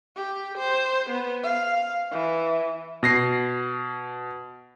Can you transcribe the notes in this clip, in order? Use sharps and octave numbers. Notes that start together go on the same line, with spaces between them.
G4
C5
B3
F5
E3
B2 A#6 C7